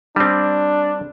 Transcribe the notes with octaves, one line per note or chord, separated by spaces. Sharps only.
G3 C4 D4